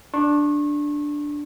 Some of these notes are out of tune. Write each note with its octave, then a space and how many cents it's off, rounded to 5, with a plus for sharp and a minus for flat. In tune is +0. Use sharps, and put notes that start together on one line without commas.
D4 +0 C#6 -35